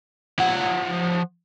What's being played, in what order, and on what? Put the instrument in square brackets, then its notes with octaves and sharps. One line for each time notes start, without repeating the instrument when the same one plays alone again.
[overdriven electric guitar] F3 F#5